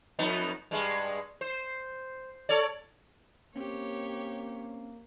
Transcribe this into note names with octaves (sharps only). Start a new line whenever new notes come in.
F2 B3 D#4
G2 G#3
C5
A4 C#5 D5
A#3 C4 C#4 G4 C#5